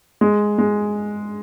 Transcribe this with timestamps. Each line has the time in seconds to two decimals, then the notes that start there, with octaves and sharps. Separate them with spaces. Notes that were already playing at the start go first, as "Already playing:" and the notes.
0.21 G#3
0.58 G#3